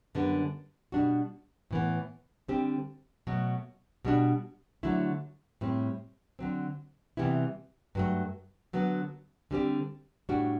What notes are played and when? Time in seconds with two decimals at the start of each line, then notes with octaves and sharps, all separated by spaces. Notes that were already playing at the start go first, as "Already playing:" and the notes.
0.15 F#2 D3 G3 B3
0.92 B2 G3 D4 F#4
1.71 A2 E3 B3
2.48 D3 G3 C4 G4
3.27 B2 F#3 A3
4.05 B2 G3 D4 F#4
4.83 D3 F#3 A3 E4
5.61 A2 G3 C4
6.39 D3 F#3 C4
7.17 C3 E3 G3 B3 E4
7.95 G2 F#3 A3
8.73 D3 F#3 B3
9.51 D3 G3 C4 G4
10.29 A2 G3 D4 F#4